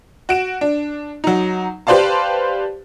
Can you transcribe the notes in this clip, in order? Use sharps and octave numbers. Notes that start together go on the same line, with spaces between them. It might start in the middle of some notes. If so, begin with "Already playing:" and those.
F#4 D7 E7
D4
F#3 D#4
G4 B4 C5 D5 F5 A5